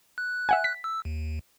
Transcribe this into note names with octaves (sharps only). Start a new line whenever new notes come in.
F#6
E5 F#5 G#5
B6
E6
D#2